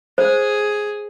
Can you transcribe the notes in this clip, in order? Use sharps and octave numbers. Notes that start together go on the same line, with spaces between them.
G#4 C5